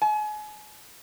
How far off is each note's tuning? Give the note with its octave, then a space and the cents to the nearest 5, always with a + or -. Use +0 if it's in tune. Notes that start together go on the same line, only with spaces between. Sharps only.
G#5 +35